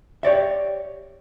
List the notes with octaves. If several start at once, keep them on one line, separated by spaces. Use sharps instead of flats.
G4 C#5 D5 E5